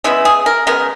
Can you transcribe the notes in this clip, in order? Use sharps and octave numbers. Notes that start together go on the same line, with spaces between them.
C#3 G#3 B3 E4
G#4
A#4
C#3 G#3 B3 A#4